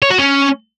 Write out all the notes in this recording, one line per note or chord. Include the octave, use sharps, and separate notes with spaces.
C#5
F#4
C#4